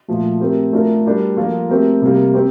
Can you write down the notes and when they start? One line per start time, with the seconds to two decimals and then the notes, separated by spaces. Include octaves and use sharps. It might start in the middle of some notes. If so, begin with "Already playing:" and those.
0.08 A#2 F3 A3
0.40 A3 C4 G4 A#4
0.73 A3 D4 F4 A#4
1.05 G3 D4 G4 A#4
1.37 F3 A#3 F4 A4
1.69 A3 C4 G4 A#4
2.02 C3 G3 A#3
2.34 C4 G4